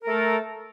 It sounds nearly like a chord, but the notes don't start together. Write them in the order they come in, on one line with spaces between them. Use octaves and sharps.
A#4 A3 A4